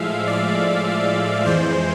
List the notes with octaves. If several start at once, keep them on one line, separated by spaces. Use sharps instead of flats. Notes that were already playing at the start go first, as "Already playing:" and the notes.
Already playing: A2 F3 G#3 E5 F5
D5
F2 E3 G#3 C5